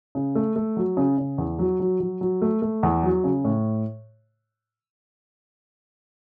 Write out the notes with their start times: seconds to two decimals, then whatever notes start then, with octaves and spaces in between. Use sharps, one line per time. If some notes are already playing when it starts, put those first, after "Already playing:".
0.15 C#3
0.35 A3
0.56 A3
0.77 F#3
0.97 C#3
1.18 C#3
1.38 E2
1.59 F#3
1.80 F#3
2.00 F#3
2.21 F#3
2.42 A3
2.62 A3
2.83 E2
3.03 F#3
3.24 C#3
3.44 A2